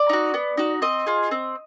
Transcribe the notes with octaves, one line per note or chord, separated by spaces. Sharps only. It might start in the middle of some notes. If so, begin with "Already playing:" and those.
Already playing: D5
D#4 F#4
B3
D#4 F#4
C4 D#5
F4 G#4
C4